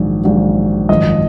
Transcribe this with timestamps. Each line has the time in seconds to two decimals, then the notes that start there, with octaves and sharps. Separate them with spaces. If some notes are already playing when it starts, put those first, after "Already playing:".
Already playing: A#1 G#2 D#3 F#3
0.24 A#1 G#2 D#3 F#3
0.89 G#1 F#2 F3 D#5